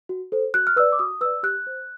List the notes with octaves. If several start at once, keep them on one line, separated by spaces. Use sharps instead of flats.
F#4
A4 C5
F#4 F#6
F6
B4 D5 E6
D6
F#4 D#6
B4 D5 E6
G4 F#6
C5